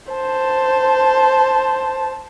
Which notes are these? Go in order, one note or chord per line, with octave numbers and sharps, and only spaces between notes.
C5 A5